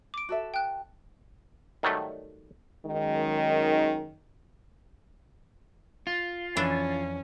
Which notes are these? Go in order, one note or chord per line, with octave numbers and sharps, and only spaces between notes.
D6 D7
F#4 A4 E5
G5 F#6
D#3 F#3 G3 A3
F#2 D#3 G#3
F4
F2 E3 C#4 D4